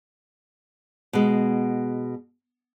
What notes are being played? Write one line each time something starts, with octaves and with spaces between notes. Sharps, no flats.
B2 G#3